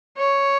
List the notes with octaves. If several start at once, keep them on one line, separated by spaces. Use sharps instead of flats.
C#5